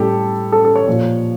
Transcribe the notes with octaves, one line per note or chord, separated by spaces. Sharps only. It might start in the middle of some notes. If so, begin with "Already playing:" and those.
Already playing: A2 G3 G4 A4
A4
A4
C#5
A#2 F3